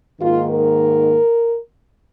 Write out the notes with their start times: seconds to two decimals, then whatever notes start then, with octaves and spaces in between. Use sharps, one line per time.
0.21 G#2 D#3 A#3 F4
0.51 A#4